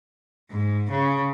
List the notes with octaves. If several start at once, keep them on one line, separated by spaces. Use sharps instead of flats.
G#2
C#3